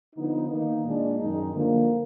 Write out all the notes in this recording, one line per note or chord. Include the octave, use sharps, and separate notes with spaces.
D3 F3 B3 D#4
D#3 A#3 D#4
A#2 G#3 D4
F#2 D#3 G#3 D#4
D3 F3 A#3